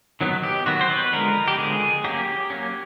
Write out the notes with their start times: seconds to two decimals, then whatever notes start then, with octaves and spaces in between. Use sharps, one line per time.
0.21 D#3 F#3 B3
0.44 G4
0.66 D#3 F#3 B3 F#4
0.81 C5
0.90 B4
1.13 D3 F3 G#3 B3 A#4
1.48 G4
1.58 D3 F3 G#3 B3 G#4
2.04 F#3 A#3 C#4 G4
2.50 F#3 A#3 C#4